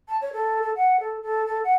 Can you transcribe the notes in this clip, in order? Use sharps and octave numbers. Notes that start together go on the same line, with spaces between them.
A5
C#5
A4
A4
F#5
A4
A4
A4
F#5